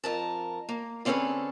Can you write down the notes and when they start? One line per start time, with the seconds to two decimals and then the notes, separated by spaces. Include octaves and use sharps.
0.04 F2 A#4 A5
0.69 A#3
1.05 D3 C4 C#4 G#4 A4 B4